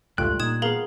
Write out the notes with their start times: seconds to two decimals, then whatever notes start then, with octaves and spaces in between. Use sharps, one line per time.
0.18 F1 C#2 G#2 G3 A3 F4 G5 F#6
0.40 A#2 D#4 D#6 G#6 E7
0.62 B3 G#4 A#4 F5 A#5